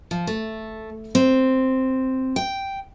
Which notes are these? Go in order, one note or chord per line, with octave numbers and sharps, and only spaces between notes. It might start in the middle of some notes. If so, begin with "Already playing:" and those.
F3
A3
C4
G5